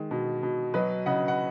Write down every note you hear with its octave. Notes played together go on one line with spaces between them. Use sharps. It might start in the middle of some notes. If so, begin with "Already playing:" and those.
Already playing: D#3 G#3
B2
B2
F#3 B4 D#5
C#3 D#5 F#5
F#5